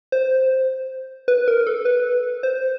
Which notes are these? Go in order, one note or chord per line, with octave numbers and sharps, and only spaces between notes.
C5
B4
A#4
A4
B4
C5